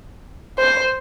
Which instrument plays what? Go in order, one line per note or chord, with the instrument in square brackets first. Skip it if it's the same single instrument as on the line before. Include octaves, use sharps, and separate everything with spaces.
[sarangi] C5